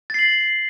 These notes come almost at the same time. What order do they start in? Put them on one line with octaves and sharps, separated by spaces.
A6 C7 F#7